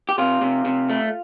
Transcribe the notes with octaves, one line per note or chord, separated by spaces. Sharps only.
G4
C3 F4
C3
C3
A3